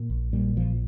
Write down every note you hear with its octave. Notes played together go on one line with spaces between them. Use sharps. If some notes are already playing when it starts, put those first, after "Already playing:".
Already playing: A#2
A#1
A#2 G3
A#1 F3